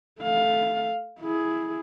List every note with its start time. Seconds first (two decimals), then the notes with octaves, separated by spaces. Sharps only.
0.20 A3 F5
1.21 E4 G#4